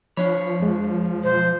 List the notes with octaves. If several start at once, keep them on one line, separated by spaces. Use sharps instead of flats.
F3 D4 C#5 B5
F2 G#3
B1 C5